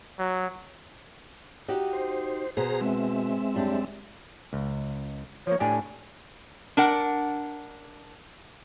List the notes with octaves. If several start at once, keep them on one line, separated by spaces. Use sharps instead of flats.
F#3
D#4 F#4 G4
C5
B2 G#4 C5 A#5
G#3 C4 E5
F#2 G3 D4
C#2
F3 A#3 C#5
A2 D4 G4 G#5
D4 A#4 F#5